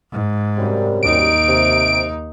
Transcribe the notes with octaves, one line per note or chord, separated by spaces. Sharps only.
G#2
F#2 C3 G3
D#2 D#4 D7
C3